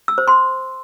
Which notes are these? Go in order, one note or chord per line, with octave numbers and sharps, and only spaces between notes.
E6
C5
C6